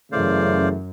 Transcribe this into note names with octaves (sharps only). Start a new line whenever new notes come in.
F#2 C#3 E3 A3 C5 D5 F5